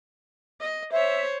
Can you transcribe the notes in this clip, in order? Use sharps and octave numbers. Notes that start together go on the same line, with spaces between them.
D#5
C5 C#5 E5